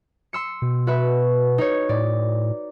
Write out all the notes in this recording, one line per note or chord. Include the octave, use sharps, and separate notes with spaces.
C6 E6 C#7
B2
F#4 B4 E5
D#4 C#5
A2 D5